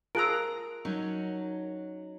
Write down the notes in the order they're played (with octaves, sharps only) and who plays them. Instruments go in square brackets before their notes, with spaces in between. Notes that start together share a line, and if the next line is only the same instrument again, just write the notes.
[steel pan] F4 G#4 A#5 [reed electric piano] A#4 A5 F#6 [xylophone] E6 D7
[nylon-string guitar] F#3 C#4 D#4